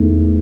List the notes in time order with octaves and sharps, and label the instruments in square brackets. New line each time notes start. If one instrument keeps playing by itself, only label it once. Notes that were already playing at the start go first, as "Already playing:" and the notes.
Already playing: [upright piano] E2 D#3 A3